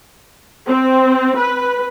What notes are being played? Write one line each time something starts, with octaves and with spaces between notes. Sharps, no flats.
C4
B4